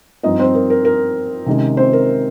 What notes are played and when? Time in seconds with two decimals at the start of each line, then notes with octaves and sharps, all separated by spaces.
0.23 G2 F3 C4 D#4 D#5
0.39 C4 C5
0.55 A#4
0.70 A#4
0.85 A#4
1.46 C3 D#3 G#3 C#4
1.77 C4 C5
1.93 A#4